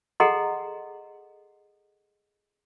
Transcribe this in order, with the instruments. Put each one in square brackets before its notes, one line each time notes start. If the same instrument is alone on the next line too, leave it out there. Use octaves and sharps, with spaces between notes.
[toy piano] G#4 A4 D#5 F#5 A#5 C6